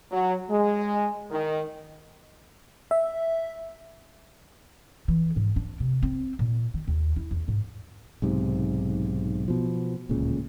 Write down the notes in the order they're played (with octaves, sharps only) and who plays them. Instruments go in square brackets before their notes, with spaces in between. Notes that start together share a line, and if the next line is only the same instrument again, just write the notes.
[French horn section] F#3
G#3
D#3
[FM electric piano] E5
[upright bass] E3
G#2
D4
C3
C4
A#2
D#3
D#2
E4
E2
G#2
[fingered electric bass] B1 G#2 C3
B2 F3
D1 C#2 A#2 C#3